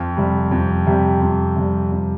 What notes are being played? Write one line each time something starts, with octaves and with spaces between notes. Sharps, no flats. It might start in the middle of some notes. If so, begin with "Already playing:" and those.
Already playing: F2
C3 G3
F2
C3 G3
F2
C3 G3
F2